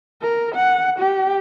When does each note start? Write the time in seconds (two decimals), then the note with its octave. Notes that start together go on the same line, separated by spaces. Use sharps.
0.22 A#4
0.55 F#5
0.99 G4